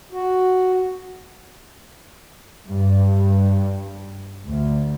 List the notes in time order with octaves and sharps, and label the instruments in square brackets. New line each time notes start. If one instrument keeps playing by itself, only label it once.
[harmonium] F#4
[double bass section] G2
D2